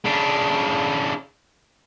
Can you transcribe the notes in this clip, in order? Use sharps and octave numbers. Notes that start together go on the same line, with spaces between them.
C#3 D4